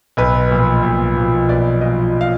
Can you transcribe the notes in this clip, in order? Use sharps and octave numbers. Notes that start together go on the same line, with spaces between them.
B1 B4
A#2 F3
B1
A#2 F3
B1 D5
A#2 F3 D#5
F5